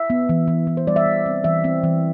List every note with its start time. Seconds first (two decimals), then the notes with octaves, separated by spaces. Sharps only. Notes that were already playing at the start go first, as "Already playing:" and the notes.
Already playing: E5
0.10 B3
0.29 E3
0.48 E3
0.67 E3
0.77 C5
0.87 G3 D5
0.96 E5
1.06 E3
1.26 C4
1.44 E3 E5
1.64 C4
1.84 E3